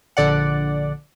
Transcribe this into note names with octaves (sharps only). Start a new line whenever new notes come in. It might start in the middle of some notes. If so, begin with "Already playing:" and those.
A#1 D3 D5 F#5